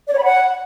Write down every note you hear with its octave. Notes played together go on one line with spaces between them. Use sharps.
D5
C#5
B5
F#5